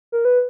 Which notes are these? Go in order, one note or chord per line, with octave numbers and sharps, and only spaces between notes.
A#4
B4